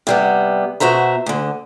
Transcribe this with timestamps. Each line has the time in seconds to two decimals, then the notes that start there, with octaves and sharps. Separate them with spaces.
0.07 C3 G3 B3
0.80 B2 F#4 C5 E5 A#5
1.26 D2 D3